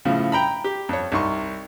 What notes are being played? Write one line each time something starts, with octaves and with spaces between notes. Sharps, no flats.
A2 C#3 F3
G5 A#5 B5
G4
F2 C#5
C2 D#4 C6 C#6